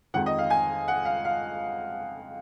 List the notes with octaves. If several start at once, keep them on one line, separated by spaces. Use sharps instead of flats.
F2 D#3 G#3 F#5
D#5
F5
G#5
F#5
F5
F5